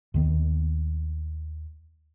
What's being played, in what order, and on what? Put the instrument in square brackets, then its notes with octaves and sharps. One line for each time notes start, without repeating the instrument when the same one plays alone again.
[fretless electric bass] D#2 D#3 B3